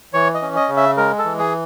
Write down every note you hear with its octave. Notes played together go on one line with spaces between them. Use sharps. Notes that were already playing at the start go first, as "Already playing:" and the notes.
E3 C#5
D#5
C#4
D#5
C#3
E5
G#3 A#4
A4
E3
G#4